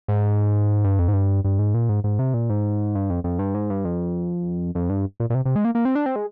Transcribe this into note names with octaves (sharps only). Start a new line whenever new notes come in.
G#2
G2
F2
G#2
G2
G2
G#2
A#2
G#2
G#2
C3
A#2
G#2
G2
F2
F2
G2
G#2
G2
F2
F2
G2
A#2
A#2
C3
C3
G#3
A#3
A#3
C4
D4
C4
G#3